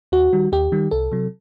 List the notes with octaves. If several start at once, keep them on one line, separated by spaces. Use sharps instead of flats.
D#2 F#4
D#3 G3
D#2 G4
D#3 G3
C2 A4
C3 F#3